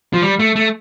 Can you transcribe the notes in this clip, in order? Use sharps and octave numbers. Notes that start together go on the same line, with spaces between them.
F3
G3
A3
A3